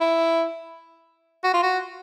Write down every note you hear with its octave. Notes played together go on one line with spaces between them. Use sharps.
E4
F#4
F4
F#4